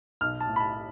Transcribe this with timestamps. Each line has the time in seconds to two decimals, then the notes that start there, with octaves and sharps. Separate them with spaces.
0.21 B1 F6
0.40 A5
0.47 A2
0.56 B5
0.60 A5